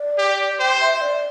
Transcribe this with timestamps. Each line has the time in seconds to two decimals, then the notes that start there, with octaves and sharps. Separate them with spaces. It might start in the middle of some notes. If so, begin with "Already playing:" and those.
Already playing: D5
0.18 G4
0.59 C5 G5
0.81 E5
0.94 E5
1.02 D5